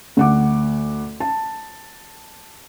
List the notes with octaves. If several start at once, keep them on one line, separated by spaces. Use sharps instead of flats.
D2 F#5 D6
A5